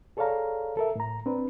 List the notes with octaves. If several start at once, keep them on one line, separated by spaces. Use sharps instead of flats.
G#4 A4 C#5 D5 F5 A#5
A4 A#4 E5
A2 A#5
C4 D4 B4